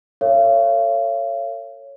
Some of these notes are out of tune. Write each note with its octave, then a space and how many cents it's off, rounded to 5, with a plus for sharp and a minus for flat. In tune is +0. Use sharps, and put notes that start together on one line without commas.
A4 +40 C#5 +0 F5 -40